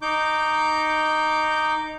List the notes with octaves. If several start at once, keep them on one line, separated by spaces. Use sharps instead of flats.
D#4 D6 G6